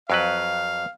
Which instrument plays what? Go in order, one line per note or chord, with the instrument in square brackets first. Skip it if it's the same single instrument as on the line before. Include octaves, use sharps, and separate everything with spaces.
[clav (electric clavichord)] F2 F#3 B4 [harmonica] F5